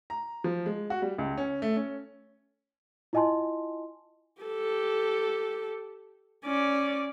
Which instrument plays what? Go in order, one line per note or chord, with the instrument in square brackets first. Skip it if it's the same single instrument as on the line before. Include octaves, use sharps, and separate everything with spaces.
[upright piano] A#5
F3
G#3
F#4
G3
C#2
C#4
A3
C#4
[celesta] E4 F4 D#5 G#5 A5 C6
[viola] G4 A4
C#4 D5